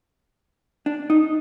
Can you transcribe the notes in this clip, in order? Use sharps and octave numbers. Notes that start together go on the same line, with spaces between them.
D4
D#4